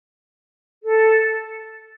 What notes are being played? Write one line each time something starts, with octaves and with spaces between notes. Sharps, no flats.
A4